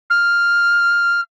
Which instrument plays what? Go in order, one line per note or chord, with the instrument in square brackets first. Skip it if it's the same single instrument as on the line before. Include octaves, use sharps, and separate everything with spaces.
[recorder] F6